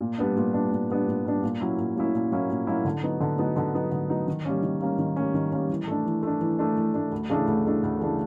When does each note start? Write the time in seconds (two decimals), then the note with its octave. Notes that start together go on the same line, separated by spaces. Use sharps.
0.01 A#2
0.18 G3 B3 D4
0.36 A#2
0.54 G3 B3 D4
0.71 A#2
0.90 G3 B3 D4
1.08 A#2
1.25 G3 B3 D4
1.43 A#2
1.61 F#3 A#3 C#4 E4
1.78 A#2
1.96 F#3 A#3 C#4 E4
2.14 A#2
2.32 F#3 A#3 C#4 E4
2.50 A#2
2.67 F#3 A#3 C#4 E4
2.85 D3
3.03 F#3 B3 D#4
3.21 D3
3.39 F#3 B3 D#4
3.56 D3
3.74 F#3 B3 D#4
3.92 D3
4.10 F#3 B3 D#4
4.27 D#3
4.45 G3 A#3 C#4
4.63 D#3
4.80 G3 A#3 C#4
4.99 D#3
5.16 G3 A#3 C#4
5.34 D#3
5.52 G3 A#3 C#4
5.69 E3
5.87 A3 D4
6.05 E3
6.23 A3 D4
6.41 E3
6.59 A3 D4
6.76 E3
6.94 A3 D4
7.12 D2
7.30 C#3 E3 A3 D4
7.47 D2
7.65 C#3 E3 A3 D4
7.83 D2
8.00 C#3 E3 A3 D4